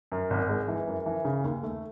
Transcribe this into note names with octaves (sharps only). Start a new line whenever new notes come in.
F#2
G#1
G#3
E3
F#2
E3
C#3
D#2
A3